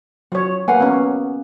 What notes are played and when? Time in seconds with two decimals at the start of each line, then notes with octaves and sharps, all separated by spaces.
0.32 F#3 F4 C#5
0.68 A#3 B4 F5 F#5 G#5
0.80 B3 C#4